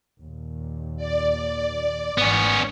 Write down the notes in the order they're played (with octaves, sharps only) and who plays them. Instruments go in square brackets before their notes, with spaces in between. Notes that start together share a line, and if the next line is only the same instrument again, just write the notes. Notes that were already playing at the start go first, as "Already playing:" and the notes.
[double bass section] D#2 A#2
[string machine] D5
[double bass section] G#1 G#2 E3 [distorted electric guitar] B3 C#4